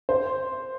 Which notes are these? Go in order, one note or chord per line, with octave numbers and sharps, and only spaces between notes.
C5